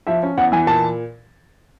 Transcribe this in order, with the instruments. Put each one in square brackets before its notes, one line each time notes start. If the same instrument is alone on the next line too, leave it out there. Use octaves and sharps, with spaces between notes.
[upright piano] F3 [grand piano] E5
[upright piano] C#4
[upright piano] E2 [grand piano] F#5
[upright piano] E3 [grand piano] G#5
[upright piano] A#2 [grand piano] A5